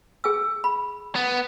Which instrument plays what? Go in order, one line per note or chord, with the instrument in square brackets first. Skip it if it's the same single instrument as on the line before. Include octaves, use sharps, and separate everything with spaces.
[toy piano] G#4 G#5 E6
B5
[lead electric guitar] B3